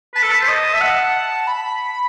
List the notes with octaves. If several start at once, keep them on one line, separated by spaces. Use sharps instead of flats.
B4 A5
A4
B4
C5
D#5
E5
F#5
B5